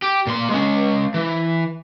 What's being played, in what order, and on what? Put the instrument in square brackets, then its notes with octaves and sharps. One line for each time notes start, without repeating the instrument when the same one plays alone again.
[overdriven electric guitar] G4
A#2 C6
G#3 C#4
E3